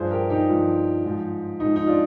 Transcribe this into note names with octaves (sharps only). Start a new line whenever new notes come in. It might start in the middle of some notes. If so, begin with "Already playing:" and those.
Already playing: G2 F3 G#4 C5
G4 A#4
D#4 G4
G2 F3
G#2 F3
G#2 F3 D#4
D#4
D4 F4